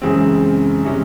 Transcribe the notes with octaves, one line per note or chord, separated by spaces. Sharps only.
F#2 C#3 E3 G#3 C4
C3 E3 G#3 C#4